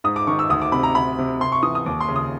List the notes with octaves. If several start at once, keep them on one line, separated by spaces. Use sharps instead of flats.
G#2 D#6
D6
D#3 C#6
E6
D2 D#6
D6
C3 B5
A#5
D2 B5
C3
C3 C6
C#6
E3 D#6
D#6
D#2 D6
C6
C#3
D#6